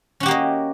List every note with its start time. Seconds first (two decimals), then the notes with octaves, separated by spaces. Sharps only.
0.20 C#4
0.23 F#4
0.26 G4
0.28 A#3
0.31 D#5